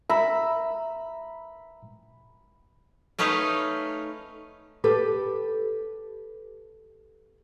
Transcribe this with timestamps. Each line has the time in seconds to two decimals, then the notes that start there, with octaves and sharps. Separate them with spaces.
0.10 E5 A#5 B5 E6
3.19 A3 C#4 D#4 B4 C#5 F5
4.84 G4 A4 B4